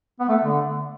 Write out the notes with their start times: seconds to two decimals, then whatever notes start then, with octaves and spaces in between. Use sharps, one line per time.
0.20 B3
0.29 A3
0.44 D3